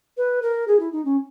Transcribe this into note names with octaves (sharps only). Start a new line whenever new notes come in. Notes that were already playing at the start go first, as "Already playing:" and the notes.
B4
A#4
G#4
E4
D#4
C#4